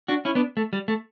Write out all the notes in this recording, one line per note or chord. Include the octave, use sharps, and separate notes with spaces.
D4 F#4
C#4 E4
B3 D4
A3
G3
A3